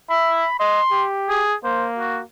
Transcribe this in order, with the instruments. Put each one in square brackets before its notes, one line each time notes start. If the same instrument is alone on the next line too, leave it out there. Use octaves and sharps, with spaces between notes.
[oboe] E5 [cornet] B5
[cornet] D#5 [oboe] C6
[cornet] G4
[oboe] G#4
[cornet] A#3 [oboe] C5
[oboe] F#4